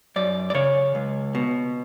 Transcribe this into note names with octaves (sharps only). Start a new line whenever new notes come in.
F#2 D5
D5
C#3 C#5
C#2
B2